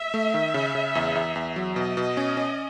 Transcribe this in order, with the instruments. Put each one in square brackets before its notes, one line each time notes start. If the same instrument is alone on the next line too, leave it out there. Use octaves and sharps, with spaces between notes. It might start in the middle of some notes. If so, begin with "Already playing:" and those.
Already playing: [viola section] E5
[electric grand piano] A3
D#3
C#3
C#3
E2
E2
E2
F#3
[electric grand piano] B2 [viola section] D#5
[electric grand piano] B2
C#4
C#4